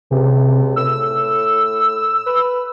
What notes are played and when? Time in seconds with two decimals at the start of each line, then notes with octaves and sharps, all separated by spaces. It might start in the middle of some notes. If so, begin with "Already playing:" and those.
0.11 C#2 C3
0.76 A2 E6
2.27 B4